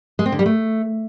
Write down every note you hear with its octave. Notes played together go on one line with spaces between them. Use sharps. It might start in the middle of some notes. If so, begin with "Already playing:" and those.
G#3
C4
D3
G3
A3